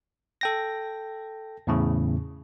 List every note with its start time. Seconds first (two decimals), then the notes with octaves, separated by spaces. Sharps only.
0.41 A4 G5 A#6
1.67 E2 A2 C#3